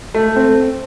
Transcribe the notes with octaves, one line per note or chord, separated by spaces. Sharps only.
A3
C4